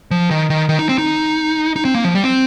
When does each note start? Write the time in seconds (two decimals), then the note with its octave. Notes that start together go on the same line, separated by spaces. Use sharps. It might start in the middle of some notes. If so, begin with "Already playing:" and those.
0.11 F3
0.31 D#3
0.50 D#3
0.69 D#3
0.79 D#4
0.89 C4
0.98 D#4
1.76 D#4
1.85 C4
1.95 A#3
2.04 F3
2.14 G3
2.24 C4